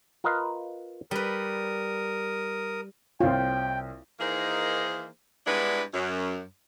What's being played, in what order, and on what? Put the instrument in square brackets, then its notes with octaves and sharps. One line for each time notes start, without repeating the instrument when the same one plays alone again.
[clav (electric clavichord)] F4 A#4 B4 D#5 F5
[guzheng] G3 B4 [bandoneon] A#4 D#6
[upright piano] C2 C4 C#5 [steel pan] F4 [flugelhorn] G5
[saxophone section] D#3 E3 A#3 D#4 G#4 C5
G2 G#3 B3 D4 E4 B4
F#2